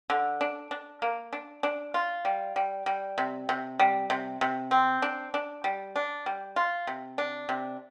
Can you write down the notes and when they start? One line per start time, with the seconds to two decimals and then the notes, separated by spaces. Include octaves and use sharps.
0.10 D3
0.41 D4
0.71 D4
1.02 A#3
1.33 D4
1.63 D4
1.94 F4
2.25 G3
2.56 G3
2.86 G3
3.18 C3
3.49 C3
3.79 G3
4.10 C3
4.41 C3
4.71 C4
5.02 D4
5.34 D4
5.64 G3
5.96 D4
6.26 G3
6.56 F4
6.87 C3
7.18 D4
7.49 C3